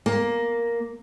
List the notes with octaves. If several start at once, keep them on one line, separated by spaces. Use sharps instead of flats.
A#3